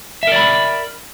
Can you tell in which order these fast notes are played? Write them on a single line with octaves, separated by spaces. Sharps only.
E5 A#4 D5 B5